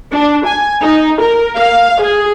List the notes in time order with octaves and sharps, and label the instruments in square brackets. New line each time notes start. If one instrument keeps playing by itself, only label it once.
[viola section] D4
G#5
D#4
A#4
F5
G#4